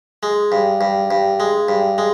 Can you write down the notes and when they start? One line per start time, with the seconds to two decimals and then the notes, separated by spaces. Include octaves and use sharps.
0.23 G#3
0.52 G2
0.81 G2
1.11 G2
1.40 G#3
1.69 G2
1.98 G#3